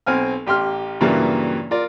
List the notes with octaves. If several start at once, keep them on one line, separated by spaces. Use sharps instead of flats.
B1 C4 G#5 F6
A1 G4 C6 F6
G2 A#2 C#3 E3 F#3 A#3
F4 A#4 D5